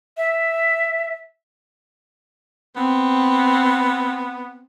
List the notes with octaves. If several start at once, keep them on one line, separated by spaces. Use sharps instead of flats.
E5
B3 C4